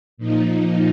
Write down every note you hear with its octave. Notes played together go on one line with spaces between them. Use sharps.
A#2 F3 D#4